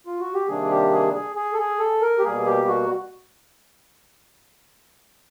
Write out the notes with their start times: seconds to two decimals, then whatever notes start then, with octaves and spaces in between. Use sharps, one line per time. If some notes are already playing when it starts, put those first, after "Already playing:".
0.07 F4
0.20 F#4
0.34 G4
0.48 C3 D#3 G3 A#3 D4 G#4
0.70 G4
0.92 G#4
1.14 G#4
1.36 G#4
1.53 A4
1.58 G#4
1.79 A4
2.02 A#4
2.19 G4
2.23 B2 G3 A#3 G#4
2.46 G4
2.67 F#4